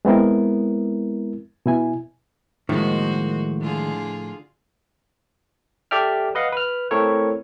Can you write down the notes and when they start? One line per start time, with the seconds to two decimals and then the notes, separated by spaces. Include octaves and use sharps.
0.05 G#3 B3 C4 E4 A#4
1.66 B2 E4 G#5
2.69 A2 D#3 F3 G#3 A#3 F#4 C5
3.61 D3 F4 G#4
5.91 G4 A4 D5 E5 G5 F6
6.35 B4 D#5 F5 F#5
6.52 B4 F6
6.91 A3 C4 E4 A4 A#4 C#5